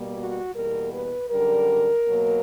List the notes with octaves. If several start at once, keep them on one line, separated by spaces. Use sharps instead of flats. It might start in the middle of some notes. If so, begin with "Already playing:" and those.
Already playing: B2 G3 A#3
F#4
E2 B2 G3 A#3 A#4
B4
F#2 D3 G3 A#4
B2 F#3 A#3